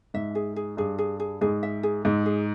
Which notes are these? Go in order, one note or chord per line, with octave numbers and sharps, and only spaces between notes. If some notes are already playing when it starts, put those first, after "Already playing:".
G#2 E5
G#4
G#4
G2 G#4
G#4
G#4
G#2 G#4
E5
G#4
G#2 G#4
G#4